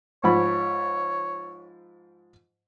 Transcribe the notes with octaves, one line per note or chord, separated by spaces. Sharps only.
G#2 F3 C#5 B5